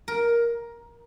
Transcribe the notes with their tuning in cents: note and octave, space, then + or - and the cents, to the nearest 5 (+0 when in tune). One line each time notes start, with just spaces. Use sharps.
A#4 +10